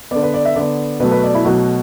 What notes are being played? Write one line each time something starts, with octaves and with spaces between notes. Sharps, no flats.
D3 B3 D5
B4
D5
E5
D3 B3 D5
B2 F#3 A3 B4
B4
D5
E4
B2 F#3 A3 F#4